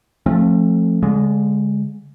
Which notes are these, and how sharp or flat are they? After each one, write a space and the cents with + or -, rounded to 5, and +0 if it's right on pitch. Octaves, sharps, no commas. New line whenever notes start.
F3 +0 A3 +0 C4 +40
D3 -45 G#3 -15